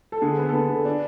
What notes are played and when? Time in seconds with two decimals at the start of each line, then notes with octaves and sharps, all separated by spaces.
0.12 A4
0.22 D3 G#4
0.38 B3
0.49 A4
0.53 D3 B4
0.69 D3
0.85 D4